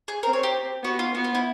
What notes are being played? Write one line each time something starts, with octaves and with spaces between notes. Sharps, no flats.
G#4
C4 A#4
C#5
G4
B3 F#4
F4
B3 F#4
F4
E4